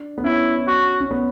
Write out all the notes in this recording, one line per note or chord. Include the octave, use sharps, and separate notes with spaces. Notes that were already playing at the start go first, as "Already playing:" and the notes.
Already playing: D4
B3
C#4 E4
F#4
C#4
B3